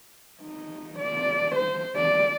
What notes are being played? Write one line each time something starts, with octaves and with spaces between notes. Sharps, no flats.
D#4
D5
C5
D5